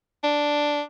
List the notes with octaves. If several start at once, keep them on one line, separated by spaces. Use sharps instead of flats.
D4